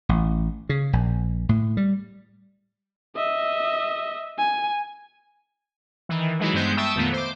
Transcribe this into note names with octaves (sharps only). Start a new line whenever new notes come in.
A1
C#3
A#1
A2
G3
D#5 E5
G#5
D#3 E3
E3 F#3 G#3 D#4 E4 F#4
G2 G#3 B3 C5 G6
E5 G5 A5 C#6 D#6 E6
F2 A#2 D#3 A3 B3
C5 D6